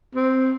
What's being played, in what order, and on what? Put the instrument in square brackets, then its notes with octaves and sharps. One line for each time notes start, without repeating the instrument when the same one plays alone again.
[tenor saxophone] C4